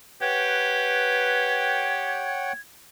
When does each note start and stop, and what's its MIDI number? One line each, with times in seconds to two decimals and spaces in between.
0.21 2.30 67
0.21 1.97 71
0.21 2.53 73
0.21 2.53 78
0.21 2.53 79
0.21 2.60 92